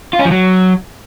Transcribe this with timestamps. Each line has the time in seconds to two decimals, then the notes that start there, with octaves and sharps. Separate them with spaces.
0.13 F4
0.19 C#4
0.25 F3
0.31 F#3